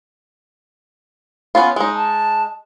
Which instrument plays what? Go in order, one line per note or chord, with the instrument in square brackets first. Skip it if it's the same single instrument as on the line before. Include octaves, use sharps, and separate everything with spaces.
[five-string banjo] B3 C#4 F4
G#3 D#4
[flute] A5